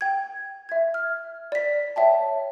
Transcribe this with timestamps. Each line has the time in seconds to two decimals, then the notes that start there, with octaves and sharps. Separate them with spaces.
0.01 G5 G#6
0.69 E5 G#6
0.94 F6
1.52 D5 B6
1.96 C#5 E5 G5 A5